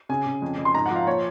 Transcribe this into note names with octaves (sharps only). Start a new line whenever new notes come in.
C#3 G#5
C#3
F2
F2
C6
G#2 A#5
F3 F#5
F5
A#2 C#5